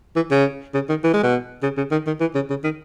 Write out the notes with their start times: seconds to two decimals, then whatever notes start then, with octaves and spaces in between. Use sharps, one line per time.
0.16 E3
0.31 C#3
0.74 C#3
0.89 D#3
1.04 E3
1.13 G#3
1.23 B2
1.63 C#3
1.77 C#3
1.91 D#3
2.06 D#3
2.20 E3
2.35 C#3
2.50 C#3
2.64 D#3